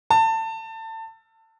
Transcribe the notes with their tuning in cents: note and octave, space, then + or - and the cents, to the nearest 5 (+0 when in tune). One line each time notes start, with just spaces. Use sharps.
A5 +25